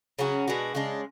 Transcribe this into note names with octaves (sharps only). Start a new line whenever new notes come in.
C#3 F#3 C#4 F#4
B2 G#3 D4 F#4
C#3 G#3 D4